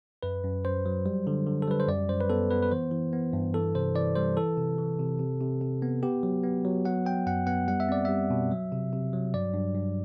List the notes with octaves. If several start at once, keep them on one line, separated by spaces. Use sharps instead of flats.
F#2 B4
F#2
F#2 C5
F#3
G3
D3
D3
A4
G3 B4
C5
F#2 D5
F#2 C5
B4
B3 A4
B3 B4
B4
E3 C5
E3
B3
G2
E3 A4
C3 C5
E3 D5
G3 C5
E3 A4
C3
E3
C3
C3
C3
C3
B3
B3 G4
F#3
B3
F#3
F#3 F#5
F#3 G5
F#2 F#5
B3 F#5
G3 F#5
E5
C4 D5
G3 E5
B2
F#3
C3
C3
F#3
G2 D5
G2
G2